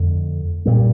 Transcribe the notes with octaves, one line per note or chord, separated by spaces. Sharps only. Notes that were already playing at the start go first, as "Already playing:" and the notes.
Already playing: F2 D3 A3
A#2 G3 A#3